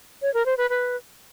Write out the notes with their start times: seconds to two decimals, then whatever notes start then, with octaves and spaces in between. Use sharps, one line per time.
0.22 C#5
0.34 A#4
0.46 C5
0.58 B4
0.69 B4